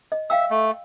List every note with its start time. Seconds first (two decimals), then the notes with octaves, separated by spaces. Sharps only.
0.12 D#5
0.30 E5 F5 G5 E6
0.50 A3